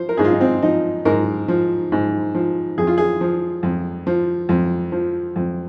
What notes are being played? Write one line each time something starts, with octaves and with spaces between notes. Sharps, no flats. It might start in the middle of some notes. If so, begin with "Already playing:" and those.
Already playing: F3 C5
A#4
G#2 G#4
F4
D#4
C4
F3 D#4
G#2 A#4
F3
G#2
F3
F2 G#4
F4
G#4
F3
F2
F3
F2
F3
F2